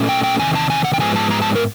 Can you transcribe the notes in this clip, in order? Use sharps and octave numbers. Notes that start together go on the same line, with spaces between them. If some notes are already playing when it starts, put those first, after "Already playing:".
Already playing: A#2 F#3 A3 C#4
G5
G5
E2 C3 D#3 G#5
A5
G#5
F#5
G5
G#2 F3 G#3 B3 G#5
A5
A#5
A5
A#4